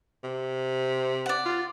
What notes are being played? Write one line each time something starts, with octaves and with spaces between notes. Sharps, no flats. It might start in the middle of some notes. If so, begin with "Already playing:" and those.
C3
D5 F#5
F4